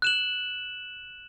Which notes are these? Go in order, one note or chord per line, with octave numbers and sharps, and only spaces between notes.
F#6 E7 F#7